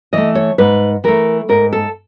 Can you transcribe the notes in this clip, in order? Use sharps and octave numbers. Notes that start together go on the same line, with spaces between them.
E3 A3 D#5
C#5
G#2 B4
E3 A3 A#4
G#2 A#4
A4